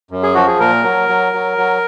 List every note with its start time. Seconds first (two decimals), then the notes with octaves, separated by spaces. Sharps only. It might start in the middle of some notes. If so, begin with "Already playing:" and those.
0.11 F#2
0.23 G#4
0.35 F3 F#4
0.47 G#4
0.60 A#2 A#4
0.84 F#3
1.09 F#3
1.33 F#3
1.58 F#3